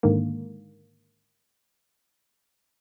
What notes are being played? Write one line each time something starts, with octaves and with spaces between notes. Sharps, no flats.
G#2 D3 D#3 A#3